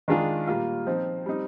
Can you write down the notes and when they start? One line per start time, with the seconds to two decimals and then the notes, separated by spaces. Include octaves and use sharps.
0.08 D#3 G#3 D4 F4
0.47 A#2 G3 A#3 F4
0.86 F3 C4 D#4
1.26 G3 C4 D#4